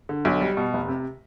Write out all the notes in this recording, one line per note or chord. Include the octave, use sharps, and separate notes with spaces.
D3
B1
G3
B2
F1
C3